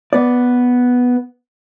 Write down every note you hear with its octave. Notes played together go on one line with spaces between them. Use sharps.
B3 D5